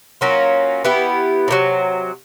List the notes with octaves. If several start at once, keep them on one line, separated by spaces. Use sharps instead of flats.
F#3 A#3 C#4 F4
B3 E4 G4
C3 D#3 F#3